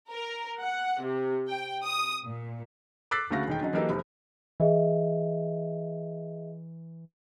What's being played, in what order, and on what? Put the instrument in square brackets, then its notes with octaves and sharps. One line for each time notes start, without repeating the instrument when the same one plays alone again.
[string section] A#4
F#5
C3
G5
D#6
A#2
[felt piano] D6 E6 F#6 A6 B6 C7
D2 C#3 A3 F#4 F5 A#6
E1 D#3 G5
D3 F#3 C#4 D#4
E3 F#3 A#3 D#4 G4 A4
F1 C3
[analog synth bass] E3 [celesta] G#4 D#5 E5